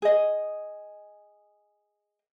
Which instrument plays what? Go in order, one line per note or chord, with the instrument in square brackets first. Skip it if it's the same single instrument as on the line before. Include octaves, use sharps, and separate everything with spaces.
[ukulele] G#4 D#5